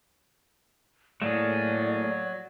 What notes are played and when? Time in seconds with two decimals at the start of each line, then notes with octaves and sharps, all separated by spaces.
1.22 A2 F#3 A3 A#3 G#4 D5